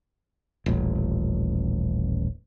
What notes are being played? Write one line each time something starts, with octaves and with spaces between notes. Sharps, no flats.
D#1 A1